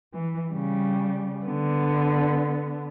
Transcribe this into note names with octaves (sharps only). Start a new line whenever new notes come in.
E3
C#3 G3
D3 B3